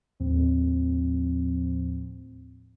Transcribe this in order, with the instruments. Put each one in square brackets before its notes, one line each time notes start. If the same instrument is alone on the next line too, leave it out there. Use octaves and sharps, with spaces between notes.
[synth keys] D#2 A2 F3 C4